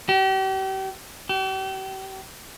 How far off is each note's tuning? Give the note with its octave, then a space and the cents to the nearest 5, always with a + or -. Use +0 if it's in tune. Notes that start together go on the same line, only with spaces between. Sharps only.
G4 -40
G4 -40